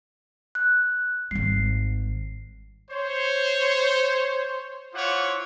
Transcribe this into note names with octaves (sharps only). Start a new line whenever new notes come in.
F#6
G#1 G3 C7
C5 C#5
E4 F4 C5 C#5 F#5 D6